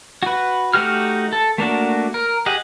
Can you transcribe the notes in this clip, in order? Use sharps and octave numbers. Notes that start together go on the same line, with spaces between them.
F#4 B4
A3 D#4 F#4 G4 F6
A4
A3 A#3 D4 F#4
A#4
G4 G#4 D#5 F#5